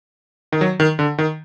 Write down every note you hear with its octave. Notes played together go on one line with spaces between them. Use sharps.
D#3
F#3
D#3
D3
D#3